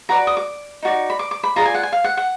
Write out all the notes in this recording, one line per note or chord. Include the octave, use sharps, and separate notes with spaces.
F#4 B4 D5 A#5
D#6
D6
D#4 F#4 D5
B5
D6
D6
B5
F4 G#4 D5 A#5
G#5
F#5
G#5
F5
F#5
F#5